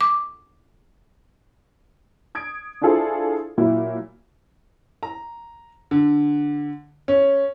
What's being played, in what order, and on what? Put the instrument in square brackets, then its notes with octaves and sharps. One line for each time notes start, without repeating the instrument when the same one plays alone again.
[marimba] D6
[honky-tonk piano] D#6 G#6 D7
D4 E4 F4 G#4 A4 C5
A#2 F#3 E4
[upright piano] A#5
D3
C#4